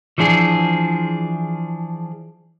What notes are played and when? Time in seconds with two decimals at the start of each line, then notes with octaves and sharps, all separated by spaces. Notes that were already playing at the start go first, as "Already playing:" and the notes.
0.18 E3 F3 D4 G#4